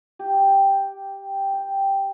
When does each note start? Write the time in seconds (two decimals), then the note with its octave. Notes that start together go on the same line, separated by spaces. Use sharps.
0.19 G4
1.53 G5